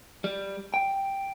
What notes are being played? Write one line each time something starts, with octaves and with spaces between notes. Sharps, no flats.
G3
G5